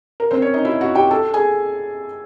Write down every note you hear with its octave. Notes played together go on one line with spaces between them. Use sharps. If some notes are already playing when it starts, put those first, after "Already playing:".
A#4
C4 C5
C#4 C#5
D#4 D#5
E4 E5
F#4 F#5
G4 G5
A4 A5
G#4 G#5